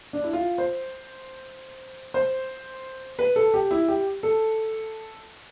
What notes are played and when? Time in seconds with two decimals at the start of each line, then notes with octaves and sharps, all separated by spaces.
0.13 D4
0.24 E4
0.33 F4
0.58 C5
2.14 C5
3.19 B4
3.36 A4
3.54 G4
3.71 E4
3.88 G4
4.23 A4